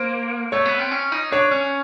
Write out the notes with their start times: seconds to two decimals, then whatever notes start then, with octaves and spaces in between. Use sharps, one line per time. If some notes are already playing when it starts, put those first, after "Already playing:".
Already playing: A#3 C5
0.52 A3 C#5
0.66 B3
0.79 C4
0.91 C#4
1.12 D#4
1.32 D4 C#5
1.51 C#4